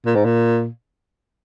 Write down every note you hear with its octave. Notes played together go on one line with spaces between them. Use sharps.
A#2
G#2
A#2